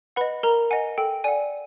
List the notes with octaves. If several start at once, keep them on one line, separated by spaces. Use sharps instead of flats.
B4 D#5 F#5 B5
A#4 A#5
D#5 F#5 G#5
A4 G5
D5 F#5 G#5